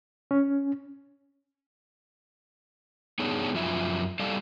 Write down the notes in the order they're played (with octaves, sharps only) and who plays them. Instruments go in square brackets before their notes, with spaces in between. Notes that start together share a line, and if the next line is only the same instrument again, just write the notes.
[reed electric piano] C#4
[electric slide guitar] G2 B3 D4 D#4 G#4 C#5
F#2 F3 F4 E5
G3 A4 D5 F5